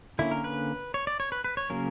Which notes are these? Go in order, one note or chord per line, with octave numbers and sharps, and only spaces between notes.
D3 A#3 C#4 E4
A#4
B4
C#5
D5
C#5
B4
B4
C#5
C#3 F#3 A#3 C#4 A#4